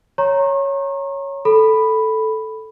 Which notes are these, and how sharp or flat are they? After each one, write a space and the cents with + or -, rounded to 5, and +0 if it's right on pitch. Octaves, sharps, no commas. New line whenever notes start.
C#5 +0 A#5 +0 C#6 -40
A4 +0 B5 +0